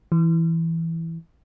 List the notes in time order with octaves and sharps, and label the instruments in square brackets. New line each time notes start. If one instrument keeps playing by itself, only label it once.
[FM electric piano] E3